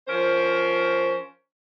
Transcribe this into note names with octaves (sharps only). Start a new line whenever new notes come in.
F3 C#4 A#4 C5